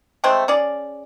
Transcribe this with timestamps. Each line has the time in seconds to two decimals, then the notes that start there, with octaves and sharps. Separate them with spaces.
0.24 G#3 A3 C4 C5
0.48 C#4 G#4 D5